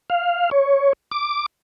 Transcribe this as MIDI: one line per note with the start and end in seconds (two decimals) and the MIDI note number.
0.10 0.50 77
0.51 0.93 73
1.11 1.46 86